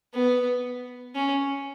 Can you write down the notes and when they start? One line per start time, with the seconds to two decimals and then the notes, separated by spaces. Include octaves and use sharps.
0.14 B3
1.15 C#4